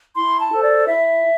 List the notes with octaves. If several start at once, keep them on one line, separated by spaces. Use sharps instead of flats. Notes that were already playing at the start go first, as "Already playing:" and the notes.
E4 C6
A5
A4 C5
D5
E4 E5